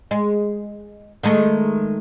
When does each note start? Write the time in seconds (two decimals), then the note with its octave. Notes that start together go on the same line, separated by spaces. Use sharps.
0.11 G#3
1.23 D#3 G#3 A3